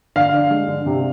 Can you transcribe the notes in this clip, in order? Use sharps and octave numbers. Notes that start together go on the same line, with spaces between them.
D3 F5
D3
G#3
D3
C3